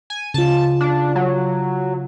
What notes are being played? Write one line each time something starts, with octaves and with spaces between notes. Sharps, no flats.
G#5
C#3 F4 A5
D4
F#3